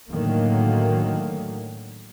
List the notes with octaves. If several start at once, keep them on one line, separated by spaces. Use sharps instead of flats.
A2 D3 D#3 F#3 A3 A#3